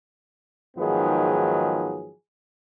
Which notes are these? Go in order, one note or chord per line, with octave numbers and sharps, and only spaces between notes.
G#2 D#3 F3 F#3 B3 G#4